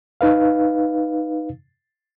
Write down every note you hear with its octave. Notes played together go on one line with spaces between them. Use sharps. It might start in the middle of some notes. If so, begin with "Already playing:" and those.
D#4 B4 F5